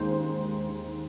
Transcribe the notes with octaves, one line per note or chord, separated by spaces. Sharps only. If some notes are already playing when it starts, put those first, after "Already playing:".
Already playing: D#2 D#3 G#3 C5